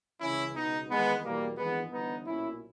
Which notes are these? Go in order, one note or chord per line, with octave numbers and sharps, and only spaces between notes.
C#2 C#3 E3 C#4 E4
C#2 B2 B3 D#4
E2 D#3 G#3 B3
E2 B2 G3 A#3
G#1 G2 E3 G#3 B3
G1 G2 E3 B3 D#4
B1 A#2 C#4 E4